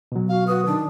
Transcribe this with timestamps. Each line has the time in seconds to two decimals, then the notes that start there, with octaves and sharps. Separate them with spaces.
0.12 B2 F#3
0.29 F#4 F5
0.47 F#4 B4 D#6
0.66 D#3 D4